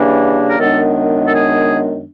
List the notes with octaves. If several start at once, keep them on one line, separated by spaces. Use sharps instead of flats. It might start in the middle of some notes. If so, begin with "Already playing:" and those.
Already playing: C#3 E3 G3 A#3 D4
A#4
F#2 D#3 G#3 B3 D4 A4
A4
G#4